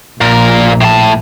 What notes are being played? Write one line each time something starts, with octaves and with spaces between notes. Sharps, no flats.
A#1 A#2 A#4
A2 A5